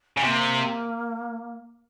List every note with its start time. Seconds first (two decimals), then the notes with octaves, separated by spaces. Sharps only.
0.17 C#3
0.23 C3 A#3 C4